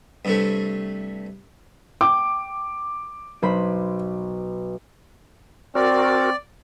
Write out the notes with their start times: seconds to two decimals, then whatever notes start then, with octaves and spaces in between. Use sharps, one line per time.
0.25 G2 C3 A3
2.01 G5 D6
3.42 B1 C5 B5
5.75 C4 F#4 A#4 D5